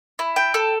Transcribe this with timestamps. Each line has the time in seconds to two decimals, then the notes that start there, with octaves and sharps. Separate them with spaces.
0.19 E4
0.36 G5
0.54 A4